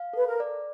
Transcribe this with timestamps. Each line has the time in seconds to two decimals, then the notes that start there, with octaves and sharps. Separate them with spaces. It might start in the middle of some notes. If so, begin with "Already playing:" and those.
Already playing: F5
0.13 A4 B4
0.27 A#4
0.40 D5